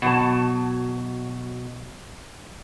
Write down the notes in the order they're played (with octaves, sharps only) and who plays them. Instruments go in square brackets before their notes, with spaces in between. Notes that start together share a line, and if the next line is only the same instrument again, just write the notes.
[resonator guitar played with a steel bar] B2 F#3 A5